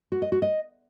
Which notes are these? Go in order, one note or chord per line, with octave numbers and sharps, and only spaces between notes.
F#4
D#5
F#4
D#5